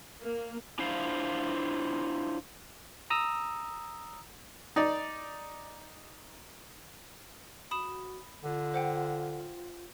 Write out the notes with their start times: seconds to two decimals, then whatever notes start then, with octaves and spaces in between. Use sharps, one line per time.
0.21 A#3
0.79 D4 E4 F4 C5 F5
3.10 A#5 D#6 E6
4.76 D#4 D5
7.71 F#4 B5 D#6 E7
8.44 D3 F4
8.74 C5 F#5 G5